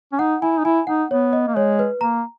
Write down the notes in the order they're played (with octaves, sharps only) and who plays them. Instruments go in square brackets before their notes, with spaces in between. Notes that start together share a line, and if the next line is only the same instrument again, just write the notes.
[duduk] C#4
[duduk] D#4 [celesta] F#5
[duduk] E4 [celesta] G#5
[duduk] D#4
[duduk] E4 [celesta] G#5
[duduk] D#4 [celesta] F#5
[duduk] B3 [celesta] C#5
[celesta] D#5
[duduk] A#3
[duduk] G#3 [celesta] C#5
[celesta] B4
[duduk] A#3 [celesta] A#5